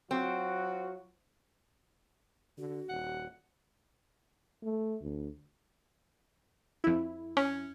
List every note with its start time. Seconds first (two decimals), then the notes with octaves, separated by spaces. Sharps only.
0.11 F#3 C4 F4 F#4
2.58 D3 F#4
2.89 D#1 F#5
4.63 A3
5.01 D2
6.84 F2 E4
7.37 C#4